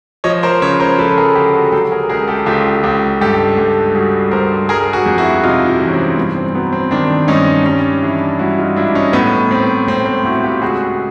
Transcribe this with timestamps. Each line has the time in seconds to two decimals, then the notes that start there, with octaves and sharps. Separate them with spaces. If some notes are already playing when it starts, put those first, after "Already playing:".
0.24 F3 C#5 D#5
0.43 A#4 C5
0.61 C#3 B4 C#5
0.79 A#4 C5
0.98 F3 A4 B4
1.11 A4
1.17 G#4 A#4
1.35 D2 G4 A4
1.55 F#4 G#4
1.72 F#3 G4 A4
1.91 G#4 A#4
2.09 C#2 G#4 A#4
2.28 G4 A4
2.46 C#2 F4 G4
2.83 C#2
3.21 G2 G4 A4
3.57 G2 G4 A4
3.95 G3 F#4 G#4
4.31 G2 A#4 C5
4.69 G3 G#4 A#4
4.93 F#4 G#4
5.06 F2
5.18 E4 F#4
5.44 C3 D#4 F4
5.68 D#4 F4
5.80 E3
5.88 C#4
5.93 C4
6.17 G2 B3
6.36 C4
6.55 F#3 B3
6.72 C4
6.91 D#3 C4 D4
7.28 G2 C#4 D#4
7.65 G3 C#4 D#4
8.03 E3 D4 E4
8.39 G3 E4 F#4
8.58 D#4 F4
8.76 G#2 D4 E4
8.95 C#4 D#4
9.13 A2 B3
9.51 A2 C4
9.87 A2 C4
10.06 C4
10.24 A2 E4 F#4
10.43 F4 G4
10.62 C#2 F#4 G#4